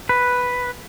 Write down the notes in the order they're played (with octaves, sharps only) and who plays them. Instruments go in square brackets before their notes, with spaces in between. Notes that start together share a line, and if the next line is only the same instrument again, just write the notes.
[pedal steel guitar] B4